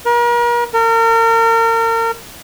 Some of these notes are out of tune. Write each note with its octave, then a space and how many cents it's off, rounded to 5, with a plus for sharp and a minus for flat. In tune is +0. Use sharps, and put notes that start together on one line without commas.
A#4 +40
A#4 -35